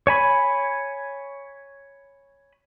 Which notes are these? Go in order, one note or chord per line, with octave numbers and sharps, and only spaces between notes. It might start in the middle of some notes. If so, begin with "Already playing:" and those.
C#5 G#5 B5